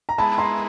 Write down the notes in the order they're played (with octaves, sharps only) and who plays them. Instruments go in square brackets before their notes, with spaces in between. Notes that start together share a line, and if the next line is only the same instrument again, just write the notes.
[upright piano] A#5
[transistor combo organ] G#3 B3 E4 [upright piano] A5 B5
[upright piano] A#5 C6